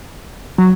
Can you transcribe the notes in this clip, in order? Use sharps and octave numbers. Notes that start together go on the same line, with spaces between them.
F#3